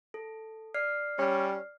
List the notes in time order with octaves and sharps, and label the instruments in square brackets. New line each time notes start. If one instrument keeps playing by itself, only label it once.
[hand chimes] A4
D5 F6 C7
[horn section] G3 C#4